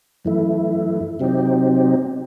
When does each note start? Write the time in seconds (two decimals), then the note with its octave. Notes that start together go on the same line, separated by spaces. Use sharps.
0.25 F#2 E3 A3 E4
1.20 C3 F#3 C4 D#4 G4